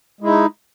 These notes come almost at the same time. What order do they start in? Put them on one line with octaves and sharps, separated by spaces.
G#3 E4 D#4